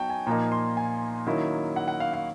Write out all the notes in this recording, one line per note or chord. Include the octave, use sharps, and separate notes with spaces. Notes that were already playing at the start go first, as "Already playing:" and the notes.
Already playing: F#3 B3 D#4 G5 A5 C#6
G#5
A#2 F3 A#3 D#4 A#5
C6
G#5
D#3 F#3 A#3 C#4 E4
F#5
F#5
F5
F5